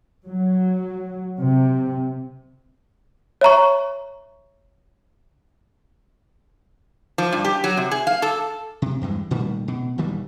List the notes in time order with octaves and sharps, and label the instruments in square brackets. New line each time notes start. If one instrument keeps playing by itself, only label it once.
[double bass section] F#3
C3
[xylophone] C#5 E5 A#5 C#6
[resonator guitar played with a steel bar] F3
G2
G4
F#3
C3
G#4
F5
A4
[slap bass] C3
E2 G2 E3 G#3
A#2 D#3 G3 A3
B2
D#1 D2 D#3 G3